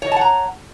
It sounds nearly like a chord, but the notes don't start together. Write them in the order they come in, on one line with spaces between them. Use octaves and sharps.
C#5 D#5 A5 F#5 A#5